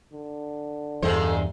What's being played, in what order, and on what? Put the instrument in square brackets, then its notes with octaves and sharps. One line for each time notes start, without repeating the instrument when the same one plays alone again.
[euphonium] D3
[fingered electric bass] E2 G2 [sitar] A#2 G#3 C5 [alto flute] A4